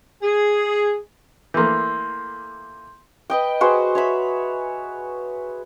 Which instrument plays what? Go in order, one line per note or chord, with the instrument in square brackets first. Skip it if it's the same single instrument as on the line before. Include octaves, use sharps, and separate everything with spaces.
[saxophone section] G#4
[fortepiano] E3 A3 A#3 [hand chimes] C6 G6
[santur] B4 D#5 G5
F#4 G#4 B4 C5
C#5 E5 B5